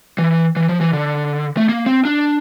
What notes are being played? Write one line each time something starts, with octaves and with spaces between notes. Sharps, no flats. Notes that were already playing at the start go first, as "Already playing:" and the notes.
E3
E3
F3
E3
D3
A3
A#3
C4
D4